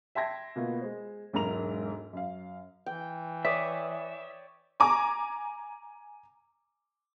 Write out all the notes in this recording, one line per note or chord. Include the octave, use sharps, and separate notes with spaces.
E5 G5 A5 C6 G#6 A#6
B2 A#3 B3 F4
G#3 C5
E1 B1 G#2 A#4 A#5 F7
F#2 F5
E3 G5
C#5 D5 E5 D#6
G#5 A#5 D6